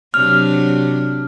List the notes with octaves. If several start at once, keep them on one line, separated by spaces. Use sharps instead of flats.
C3 F#3 D4 F6